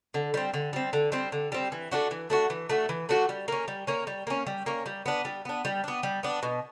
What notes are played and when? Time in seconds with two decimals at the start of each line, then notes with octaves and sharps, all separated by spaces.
0.14 D3
0.34 G3 C4
0.54 D3
0.73 G3 C4
0.93 D3
1.12 G3 C4
1.32 D3
1.52 G3 C4
1.72 E3
1.91 A3 D4 F#4
2.11 E3
2.30 A3 D4 F#4
2.50 E3
2.69 A3 D4 F#4
2.89 E3
3.09 A3 D4 F#4
3.29 G3
3.48 A#3 C#4
3.68 G3
3.87 A#3 C#4
4.07 G3
4.27 A#3 C#4
4.47 G3
4.66 A#3 C#4
4.86 G3
5.06 B3 D4
5.25 G3
5.45 B3 D4
5.65 G3
5.84 B3 D4
6.03 G3
6.23 B3 D4
6.43 B2